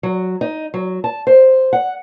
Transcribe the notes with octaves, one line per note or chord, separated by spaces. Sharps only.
F#3
D#4
F#3
A5
C5
F#5